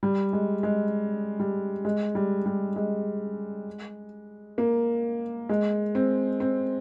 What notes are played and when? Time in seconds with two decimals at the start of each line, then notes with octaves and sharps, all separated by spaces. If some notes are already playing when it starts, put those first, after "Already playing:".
0.03 G3
0.33 G#3
0.63 G#3
1.40 G3
1.85 G#3
2.15 G3
2.46 G3
2.76 G#3
4.58 A#3
5.49 G#3
5.95 C4
6.40 C4